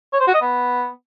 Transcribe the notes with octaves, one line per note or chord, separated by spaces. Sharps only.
C#5
C5
F#4
D#5
B3